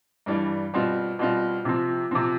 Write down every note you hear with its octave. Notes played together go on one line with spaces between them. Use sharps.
G2 E3 G3 D4
B2 G3 C4 F4
B2 G3 C4 F4
C3 F3 C4
C3 F3 C4